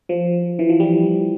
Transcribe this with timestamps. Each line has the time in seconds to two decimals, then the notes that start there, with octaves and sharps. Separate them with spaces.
0.09 F3
0.59 E3
0.69 F3
0.80 G3